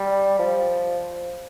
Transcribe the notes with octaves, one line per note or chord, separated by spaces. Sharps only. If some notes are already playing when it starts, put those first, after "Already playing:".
Already playing: G3
F3